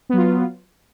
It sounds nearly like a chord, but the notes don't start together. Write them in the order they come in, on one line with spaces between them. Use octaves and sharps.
B3 F#3 F4